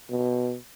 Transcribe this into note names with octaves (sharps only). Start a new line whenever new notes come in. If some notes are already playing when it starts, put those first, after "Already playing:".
B2